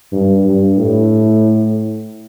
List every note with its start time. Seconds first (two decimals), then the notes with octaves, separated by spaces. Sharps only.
0.12 G2
0.45 G2
0.77 A2